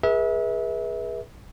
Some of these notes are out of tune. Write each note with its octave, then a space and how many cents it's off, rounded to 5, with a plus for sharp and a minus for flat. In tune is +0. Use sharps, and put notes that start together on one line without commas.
G#4 +0 B4 -40 E5 -30